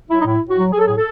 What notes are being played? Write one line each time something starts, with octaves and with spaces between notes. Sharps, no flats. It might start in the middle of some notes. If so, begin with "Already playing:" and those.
F#3 E4
D#4
A2 E4
A2
F#4
F#3
F#3 G#4
A4
A2 G#4
A4